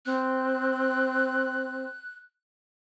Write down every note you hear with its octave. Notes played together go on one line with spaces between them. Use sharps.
C4 F#6